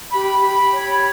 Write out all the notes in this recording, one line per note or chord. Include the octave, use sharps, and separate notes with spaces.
G4 B5
G4
C#5